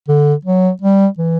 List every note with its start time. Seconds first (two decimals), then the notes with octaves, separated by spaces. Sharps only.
0.09 D3
0.45 F#3
0.82 G3
1.19 E3